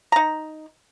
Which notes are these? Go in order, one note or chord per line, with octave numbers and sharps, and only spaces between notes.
D#4 A#5